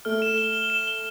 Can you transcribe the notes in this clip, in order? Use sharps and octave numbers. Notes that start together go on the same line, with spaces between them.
A3 F6
E7
G7
G7
E7
G7